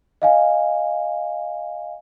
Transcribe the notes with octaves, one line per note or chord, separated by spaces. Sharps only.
D#5 F5 G#5